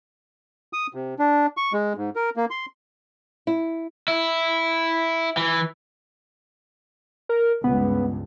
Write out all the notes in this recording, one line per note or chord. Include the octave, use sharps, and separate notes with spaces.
D#6
C3
D4
C#6
G#3
G#2
A#4
A#3
C6
E4
E4
E3
A#4
C#2 G2 B3